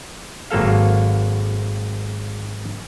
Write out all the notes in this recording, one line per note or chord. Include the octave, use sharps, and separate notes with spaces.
G#1 F#3 A#3 A4 F5